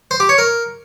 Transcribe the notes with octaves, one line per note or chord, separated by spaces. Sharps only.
C5
G4
C#5
A#4